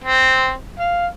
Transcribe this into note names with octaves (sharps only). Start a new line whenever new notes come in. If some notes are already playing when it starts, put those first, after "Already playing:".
C4
F5